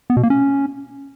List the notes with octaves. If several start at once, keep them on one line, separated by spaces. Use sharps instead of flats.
B3
B2
A#3
C#4